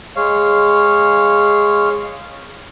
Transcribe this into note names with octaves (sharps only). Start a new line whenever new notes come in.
G#3 C#5 F5